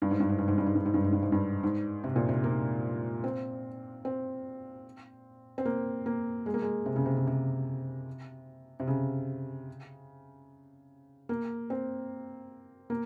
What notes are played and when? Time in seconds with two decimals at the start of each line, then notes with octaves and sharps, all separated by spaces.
0.02 G2
0.11 G#2
0.20 G2
0.29 G#2
0.38 G2
0.48 G#2
0.58 G2
0.67 G#2
0.75 G2
0.85 G#2
0.94 G2
1.04 G#2
1.12 G2
1.22 G#2
1.32 G2
1.63 G#2
2.04 C3
2.16 A#2
2.29 C3
2.44 A#3
3.24 C4
4.05 C4
5.58 C4
5.65 A#3
6.06 A#3
6.46 G#3
6.54 A#3
6.62 G#3
6.86 C3
6.96 C#3
7.06 C3
7.17 C#3
7.27 C3
8.80 C3
8.87 C#3
11.29 A#3
11.70 C4
12.90 A#3